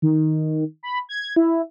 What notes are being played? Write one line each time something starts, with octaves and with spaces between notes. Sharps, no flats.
D#3
B5
G#6
E4